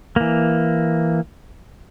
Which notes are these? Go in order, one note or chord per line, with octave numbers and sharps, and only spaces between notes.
E3 A#3